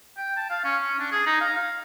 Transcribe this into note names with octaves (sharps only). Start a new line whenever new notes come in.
G5
A5
F5
C#4
C#4
D4
G#4
D#4
F5
F5